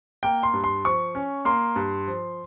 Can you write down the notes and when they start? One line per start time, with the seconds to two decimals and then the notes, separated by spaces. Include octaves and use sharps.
0.23 A#3 G5
0.43 C6
0.54 G2
0.64 C6
0.85 F3 C#6
1.15 C#4
1.45 A#3 C6
1.76 G2
2.08 F3